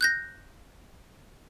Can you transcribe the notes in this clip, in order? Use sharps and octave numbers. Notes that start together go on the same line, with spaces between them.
F#6 G6 A#6